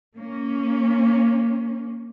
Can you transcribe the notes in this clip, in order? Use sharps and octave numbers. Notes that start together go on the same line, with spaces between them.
A#3 C#4